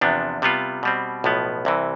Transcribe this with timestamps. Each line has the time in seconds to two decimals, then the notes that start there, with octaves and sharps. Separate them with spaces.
0.01 E2 C3 F3 B3 D4
0.42 C3 G3 B3 F4
0.83 B2 G3 C4
1.24 B1 A2 F3 B3
1.65 C2 C3 E3